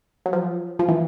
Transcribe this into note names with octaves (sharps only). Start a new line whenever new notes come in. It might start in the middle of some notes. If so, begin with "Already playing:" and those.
F#3
F3
F3
E3